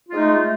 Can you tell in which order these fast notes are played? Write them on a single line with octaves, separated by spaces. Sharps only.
F4 G#3 D#4 A3